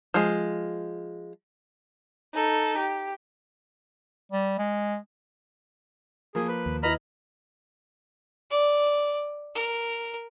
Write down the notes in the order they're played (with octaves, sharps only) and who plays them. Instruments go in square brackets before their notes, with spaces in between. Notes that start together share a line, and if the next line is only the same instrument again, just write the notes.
[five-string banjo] F3 G#3
[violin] D#4 A4
G4
[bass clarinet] G3
G#3
[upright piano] F3 A#3 [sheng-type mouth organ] G#4
[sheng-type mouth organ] B4
[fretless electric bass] D#2
[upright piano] E4 B4 D#5 [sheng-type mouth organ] A#5 B5 F6
[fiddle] D5
A#4